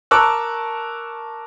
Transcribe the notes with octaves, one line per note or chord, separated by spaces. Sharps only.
A#4 A5 C#6 D6 E6 F#6